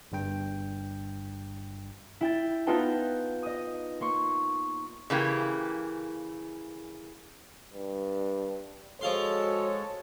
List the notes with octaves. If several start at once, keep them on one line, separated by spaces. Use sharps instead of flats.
G1 G2 G5
E4 G5 A6
B3 D#4 F4 B4 G5 A5
D#5 D#6
A#3 C6 C#6
C#3 E3 A#3 G4
G2
F3 G#3 F#4 A4 C#5 F5 C6